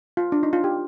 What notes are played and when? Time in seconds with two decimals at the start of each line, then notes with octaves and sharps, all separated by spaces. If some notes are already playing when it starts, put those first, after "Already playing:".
0.17 F4
0.32 D4
0.43 D#4
0.53 F4
0.64 G4